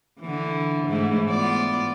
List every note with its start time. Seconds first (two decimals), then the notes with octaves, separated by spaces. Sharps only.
0.21 D3 E3
0.88 G#2 E3 A3
1.30 B3 F4 D5